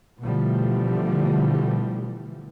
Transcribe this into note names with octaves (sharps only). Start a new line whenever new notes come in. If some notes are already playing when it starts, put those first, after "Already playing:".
B2 D3 E3 F3 G3 A3